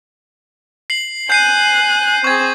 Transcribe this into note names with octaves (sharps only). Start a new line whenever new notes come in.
C7 F#7
G#5 F#6 G6 C7 D#7
C4 G#4 C#6 G#6